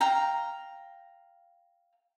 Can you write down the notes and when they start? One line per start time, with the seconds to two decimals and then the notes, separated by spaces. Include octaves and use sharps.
0.01 F5 G5 A#5